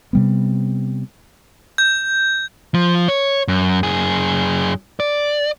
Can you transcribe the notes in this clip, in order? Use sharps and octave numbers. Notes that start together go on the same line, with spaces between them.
C3 G3 B3
G6
F3
C#5
F#2
F#2 G#4
D5